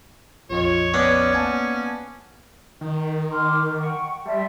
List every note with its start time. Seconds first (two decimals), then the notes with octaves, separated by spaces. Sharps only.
0.50 A#1 F2 F4 C#5 D#5
0.94 B3 C#4 D4 C#5
1.34 A#3 F#5 G#5 A5
2.81 D#3
3.30 C6 D6 F6
3.78 F#5 G5 C#6
4.25 G3 E5 A5 C6